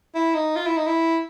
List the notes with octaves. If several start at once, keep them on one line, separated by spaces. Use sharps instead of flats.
E4
D#4
F4
E4
D#4
E4